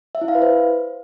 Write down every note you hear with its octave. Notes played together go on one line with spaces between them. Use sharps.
E5
E4
F5
B4
C5